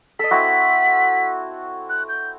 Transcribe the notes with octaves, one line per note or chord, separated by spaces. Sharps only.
A4 D#5 B6
C4 E4 F#4
F#6
G6